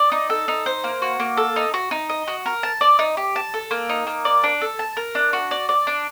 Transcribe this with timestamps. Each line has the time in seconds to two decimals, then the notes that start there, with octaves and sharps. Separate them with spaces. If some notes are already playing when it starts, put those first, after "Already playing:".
Already playing: D5
0.12 D#4
0.30 A4
0.48 D#4
0.66 C5
0.84 A#3
1.02 F#4
1.20 A#3
1.37 A4
1.56 D#4
1.74 F#4
1.91 D#4
2.09 D#5
2.28 F#4
2.46 A#4
2.63 A5
2.81 D5
2.99 D#4
3.17 G4
3.36 A5
3.54 A4
3.71 A#3
3.89 D#4
4.07 A#3
4.25 D5
4.44 D4
4.61 A4
4.79 A5
4.97 A#4
5.15 D4
5.33 F#4
5.51 D5
5.69 D5
5.87 D4